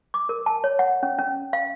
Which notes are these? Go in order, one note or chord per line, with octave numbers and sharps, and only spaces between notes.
D6
A#4
A5
C#5
F#5
C#4
C#4
F5